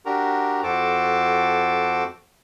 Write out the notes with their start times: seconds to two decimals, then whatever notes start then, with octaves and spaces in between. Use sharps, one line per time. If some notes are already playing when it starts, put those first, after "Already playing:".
0.06 D4 F#4 G4 A#4 A#5
0.63 F2 F#4 A4 C5 A5 D6